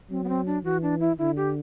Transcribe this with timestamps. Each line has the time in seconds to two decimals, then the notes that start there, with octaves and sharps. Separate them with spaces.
0.10 F#3 C4
0.24 B3
0.29 C4
0.46 D4
0.64 E3 F#4
0.82 D4
1.00 E4
1.18 D3 E4
1.36 G4